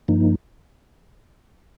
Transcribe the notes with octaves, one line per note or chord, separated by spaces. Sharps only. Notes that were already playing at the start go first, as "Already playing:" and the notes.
G2 F3 A#3 D#4